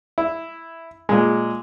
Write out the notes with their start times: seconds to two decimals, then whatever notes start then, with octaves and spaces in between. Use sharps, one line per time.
0.18 E4
1.09 A#2 G#3